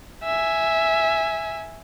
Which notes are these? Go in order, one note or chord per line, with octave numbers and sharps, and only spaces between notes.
E5 G#5